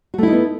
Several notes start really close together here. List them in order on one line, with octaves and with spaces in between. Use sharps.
F#4 A3 E4 D#4 B3